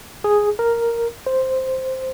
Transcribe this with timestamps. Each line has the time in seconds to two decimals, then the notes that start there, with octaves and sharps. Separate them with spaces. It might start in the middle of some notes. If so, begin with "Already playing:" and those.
0.24 G#4
0.59 A#4
1.27 C5